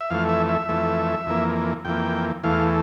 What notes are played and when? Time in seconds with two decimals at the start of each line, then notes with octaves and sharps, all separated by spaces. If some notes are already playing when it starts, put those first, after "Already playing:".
0.01 E5
0.10 F2 E3 A3 F5
0.29 E5
0.49 E5
0.69 F2 E3 A3
1.27 F2 E3 A#3
1.85 F2 E3 A#3 G5
2.44 E2 E3 A3 F5